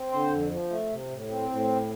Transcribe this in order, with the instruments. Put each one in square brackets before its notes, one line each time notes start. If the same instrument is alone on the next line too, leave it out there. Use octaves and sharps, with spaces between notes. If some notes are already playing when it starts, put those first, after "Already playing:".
Already playing: [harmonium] C4
D3 C5
F2
F3
A3
C3
A2
C4
A2